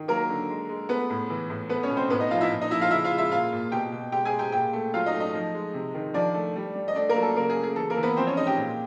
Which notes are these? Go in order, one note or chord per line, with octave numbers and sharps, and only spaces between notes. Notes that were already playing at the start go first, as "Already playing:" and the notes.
Already playing: D#3
F#3 A#3 A#4
D3
G#3
G#3
A3 B3 B4
A2
E3
A2
A3 B3 B4
C#4 C#5
B2
C4 C5
A2 B3 B4
D#4 D#5
F3 F4 F5
E4 E5
A#2
D#4 D#5
F3 E4 E5
F4 F5
C#3 E4 E5
F4 F5
G#3
E4 E5
A#2 F4 F5
A#2
B2 G4 G5
B2
G#3 G4 G5
G#4 G#5
G#3
G4 G5
A#2 G4 G5
A3
F#3 F4 F5
D#4 D#5
A3
D#4 D#5
F3
G#3
C3
D#3
F3 D4 D5
A3
G3
G3
D#5
A3 D4 D5
A#3 A#4
F#3
A4
C#3 A#3 A#4
G#4
A3
G#4
E3 A4
A#3 A#4
E3
B3 B4
F3 C4 C5
C#4 C#5
G#3 D#4 D#5
G4 G5
A#2